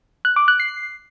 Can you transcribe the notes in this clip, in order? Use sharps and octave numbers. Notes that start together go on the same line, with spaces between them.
F#6
D6
F#6
C7